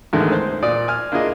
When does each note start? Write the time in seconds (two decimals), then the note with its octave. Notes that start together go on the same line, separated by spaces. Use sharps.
0.13 A1 E2 D3 D#3 G#3 A3
0.32 C5
0.63 A#2 D5 D#6
0.88 G#5 F6
1.12 A#3 D4 E4 F4 G#4 D#5